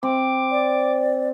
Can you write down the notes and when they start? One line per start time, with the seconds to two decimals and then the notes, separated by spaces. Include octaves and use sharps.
0.03 C4 D6
0.51 D5